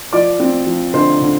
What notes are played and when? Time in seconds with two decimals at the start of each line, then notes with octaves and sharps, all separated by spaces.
0.13 F3 D5 D6
0.40 C4
0.67 F3
0.94 D3 C5 C6
1.21 D3